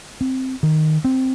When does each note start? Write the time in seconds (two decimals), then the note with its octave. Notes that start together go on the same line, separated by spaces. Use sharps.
0.21 C4
0.63 D#3
1.04 C4